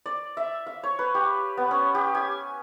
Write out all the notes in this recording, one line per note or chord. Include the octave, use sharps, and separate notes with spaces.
D5
E5
F5
C#5
B4
G4
B3
C#4
G4
G#5